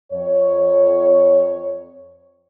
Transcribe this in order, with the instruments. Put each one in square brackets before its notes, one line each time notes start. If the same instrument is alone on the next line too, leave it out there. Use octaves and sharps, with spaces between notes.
[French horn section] F2 C#5